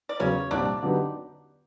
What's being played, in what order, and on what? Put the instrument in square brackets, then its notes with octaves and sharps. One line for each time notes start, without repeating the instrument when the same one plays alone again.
[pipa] D5
[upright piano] E2 C#3 F#3 [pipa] C#4 C#5
[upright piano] C2 A#2 F3 [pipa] D4 D5
[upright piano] D3 F#3 B3 D#4 G4